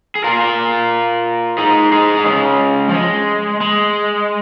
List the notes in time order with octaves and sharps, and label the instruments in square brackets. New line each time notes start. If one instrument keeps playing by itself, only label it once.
[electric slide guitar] G#4
F4 A#4
D#4 G#4
D#4 G#4
D#4
G#3 C#4
F3
G#3
G#3